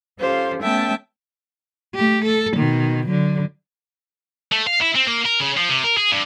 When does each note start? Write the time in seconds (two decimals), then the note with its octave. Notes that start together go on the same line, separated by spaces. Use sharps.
0.19 C#4 F4 G4 A4 C5 F5
0.61 A3 B3 C#4 E5 G5 A5
1.95 A3 G4
2.25 A4
2.56 B2 D#3
3.07 D3 F#3
4.52 A3
4.67 F5
4.81 E4
4.95 C4
5.07 A#3
5.25 A#4
5.40 C#3
5.57 F3
5.69 C3
5.84 A#4
5.97 G#4
6.11 G2